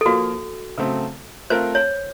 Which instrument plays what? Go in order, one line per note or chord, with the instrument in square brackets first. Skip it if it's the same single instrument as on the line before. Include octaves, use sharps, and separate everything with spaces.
[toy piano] A4
[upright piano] F3 A#3 F4 A#4 [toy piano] F#4
[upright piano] C#3 F#3 A3 C4
[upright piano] A3 C4 F4 A#4 [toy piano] C5
[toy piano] C#5